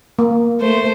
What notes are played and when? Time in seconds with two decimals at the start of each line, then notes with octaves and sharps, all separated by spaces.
0.19 A#3
0.60 A3 C5